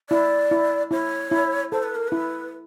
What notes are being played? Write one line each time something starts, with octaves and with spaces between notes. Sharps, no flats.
E4 D5
E4
E4 C#5
E4
A4 C5
B4
A#4
E4 B4